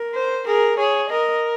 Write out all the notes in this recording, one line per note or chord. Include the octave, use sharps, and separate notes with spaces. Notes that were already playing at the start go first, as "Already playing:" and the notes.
Already playing: A#4
C5
G#4 A#4
G#4 C#5
A#4 D#5